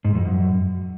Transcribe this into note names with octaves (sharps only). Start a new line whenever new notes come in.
G#2
F2
F#2